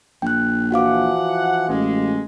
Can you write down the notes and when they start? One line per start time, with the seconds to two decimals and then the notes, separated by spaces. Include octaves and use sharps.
0.22 A#1 G5 F#6
0.72 E3 F3 F#4 F5 F#5 D6
1.69 A1 G#3